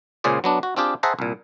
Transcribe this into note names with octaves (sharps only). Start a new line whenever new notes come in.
C#2 A#2 C#3 G#4 C5 D5
F#3 B3 D4
F#4
C4 D4 F4 G4 G#4
G#4 C5 E5 F#5 A5 A#5
C2 A#2